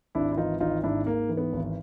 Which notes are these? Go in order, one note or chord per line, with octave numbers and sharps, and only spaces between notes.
G#1 D4 E4
E4
E3 D#4 F4
G#1 D#4 F4
G#2 D4 E4
G#2 A#3
E3
B3
G#1